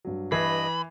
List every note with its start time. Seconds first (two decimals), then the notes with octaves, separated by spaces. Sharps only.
0.05 G2 F#3
0.32 G2 E3 D#5 B5 G#6 C7